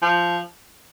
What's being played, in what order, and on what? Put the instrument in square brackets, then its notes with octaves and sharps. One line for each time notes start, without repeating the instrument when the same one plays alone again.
[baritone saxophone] F3